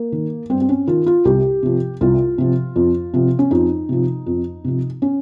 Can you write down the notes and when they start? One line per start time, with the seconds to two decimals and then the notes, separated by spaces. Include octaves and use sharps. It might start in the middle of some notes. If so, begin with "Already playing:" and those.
Already playing: A#3
0.12 D#3
0.50 G2 C4
0.61 C4
0.69 C#4
0.87 D#3 F4
1.06 F4
1.25 C2 G4
1.63 C3 F3
2.01 C2 F4
2.38 C3 F3
2.76 F2
3.14 C3 F3
3.39 C#4
3.51 F2 D#4
3.89 C3 F3
4.26 F2
4.64 C3 F3
5.02 C#4